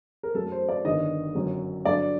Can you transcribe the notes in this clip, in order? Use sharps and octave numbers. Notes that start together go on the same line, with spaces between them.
A#4
F#2 F#3 A3 A4
C5
D5
G1 G2 D#3 D#5
G1 F#2 F#3
G2 D3 F#3 D5